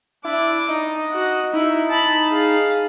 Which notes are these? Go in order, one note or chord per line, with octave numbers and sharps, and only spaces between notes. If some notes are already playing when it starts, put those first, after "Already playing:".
D4 E4 D6
D#4 D#5
F#4
D#4 E4
A5 B5
G#4 F5